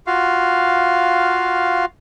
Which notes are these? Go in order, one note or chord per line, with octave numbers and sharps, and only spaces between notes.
F4 F#4 F5